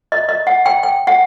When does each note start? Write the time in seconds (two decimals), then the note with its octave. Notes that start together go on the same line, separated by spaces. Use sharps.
0.12 D#5
0.29 D#5
0.47 F#5
0.66 G5
0.83 G5
1.07 F#5